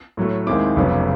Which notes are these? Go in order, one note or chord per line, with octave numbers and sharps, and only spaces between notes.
A2 F#3 A3
D#2 D#3 G#3 C4 E4 D6
F1 F2 C#3 F#3 B3